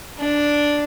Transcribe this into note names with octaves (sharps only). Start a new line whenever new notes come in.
D4